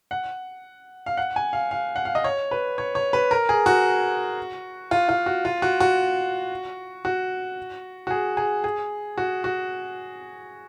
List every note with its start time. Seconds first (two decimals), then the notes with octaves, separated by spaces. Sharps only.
0.11 F#5
1.06 F5
1.17 F#5
1.36 G#5
1.53 F5
1.71 F5
1.96 F#5
2.05 F5
2.15 D#5
2.24 C#5
2.51 B4
2.78 C#5
2.95 C#5
3.13 B4
3.31 A#4
3.49 G#4
3.66 F#4
4.91 F4
5.09 F4
5.26 F#4
5.45 F4
5.62 F#4
5.80 F#4
7.05 F#4
8.07 F#4
8.11 G#4
8.37 G#4
8.64 G#4
9.18 F#4
9.44 F#4